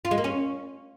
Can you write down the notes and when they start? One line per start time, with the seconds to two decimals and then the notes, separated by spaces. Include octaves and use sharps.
0.05 F4
0.11 G#3
0.18 A#3
0.24 C#4